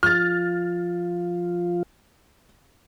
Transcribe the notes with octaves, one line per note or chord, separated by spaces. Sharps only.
F3 F4 F6 A6